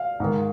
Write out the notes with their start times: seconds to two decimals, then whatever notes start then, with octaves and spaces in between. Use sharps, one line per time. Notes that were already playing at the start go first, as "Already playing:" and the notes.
Already playing: F5
0.20 G#2 D#3